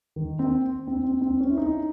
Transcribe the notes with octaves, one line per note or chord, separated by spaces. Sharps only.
D#3
C4
C4
C4
C4
C#4
E4
D#4